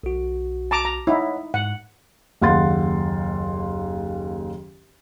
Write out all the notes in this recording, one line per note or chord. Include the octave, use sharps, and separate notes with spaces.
B1 F#4
A5 A#5 D6
A#5
D#4 E4 C#5 F#5
G#2 F#5
F#1 D#2 F5 F#5 C6 A6